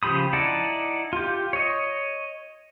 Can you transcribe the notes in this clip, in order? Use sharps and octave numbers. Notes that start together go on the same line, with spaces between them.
C#3 F3 G4 B5 D#6
D#4 E4 D5 F#5 A5
F4 G4
C#5 D#5